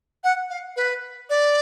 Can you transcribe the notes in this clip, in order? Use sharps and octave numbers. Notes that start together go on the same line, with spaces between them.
F#5
F5
B4
D5